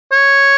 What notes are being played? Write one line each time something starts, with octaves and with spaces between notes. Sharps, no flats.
C#5